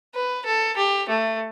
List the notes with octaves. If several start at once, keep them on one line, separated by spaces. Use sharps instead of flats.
B4
A4
G4
A3